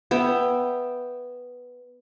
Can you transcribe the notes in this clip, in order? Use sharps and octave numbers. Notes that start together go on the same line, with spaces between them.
B3 E5 G5